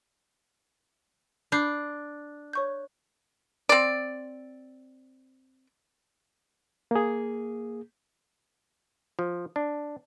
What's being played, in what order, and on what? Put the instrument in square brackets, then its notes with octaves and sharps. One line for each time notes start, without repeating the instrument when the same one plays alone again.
[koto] D4 [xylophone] B5 G6 C7
[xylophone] C#5 C#6 G6
[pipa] C4 D5
[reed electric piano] A#3 G#4
[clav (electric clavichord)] F3
D4